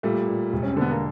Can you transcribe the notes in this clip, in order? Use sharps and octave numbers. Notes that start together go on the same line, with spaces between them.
A#2 G3 A3
A#2
E1
C#4
C4
D3 B3
A#3